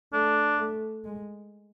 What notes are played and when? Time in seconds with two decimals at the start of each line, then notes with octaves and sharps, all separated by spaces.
0.12 A3 D4
0.58 A3
1.05 G#3